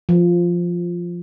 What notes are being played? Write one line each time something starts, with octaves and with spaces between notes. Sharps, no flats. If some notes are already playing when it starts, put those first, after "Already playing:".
F3